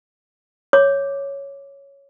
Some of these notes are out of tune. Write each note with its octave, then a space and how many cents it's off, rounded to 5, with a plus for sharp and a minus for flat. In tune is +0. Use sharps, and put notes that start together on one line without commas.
C#5 +0 D6 +0